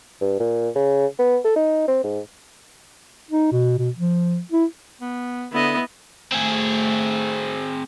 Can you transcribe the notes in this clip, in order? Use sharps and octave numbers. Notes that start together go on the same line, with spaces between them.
G2
A#2
C#3
B3
A4
D#4
C4
G#2
D#4
B2
B2
F3
E4
B3
D3 B3 E4 D#5
A3 C4 G#4